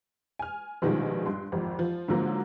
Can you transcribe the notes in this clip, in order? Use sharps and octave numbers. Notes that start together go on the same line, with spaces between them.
G#5 F6
A#1 B2 D#3 F3 G3 G#3
G2 C6
G#1 F2 G4
F3
G#2 D3 F3 F#3 A#3